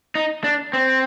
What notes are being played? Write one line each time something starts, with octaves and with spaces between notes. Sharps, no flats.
D#4
D4
C4